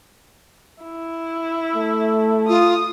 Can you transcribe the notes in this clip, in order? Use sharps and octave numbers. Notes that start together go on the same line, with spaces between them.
E4
A3
F4 D#6